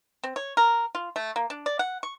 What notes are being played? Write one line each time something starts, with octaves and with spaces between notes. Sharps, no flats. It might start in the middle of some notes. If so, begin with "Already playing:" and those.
C4
C#5
A#4
F4
A3
A#3
D4
D5
F#5
C#6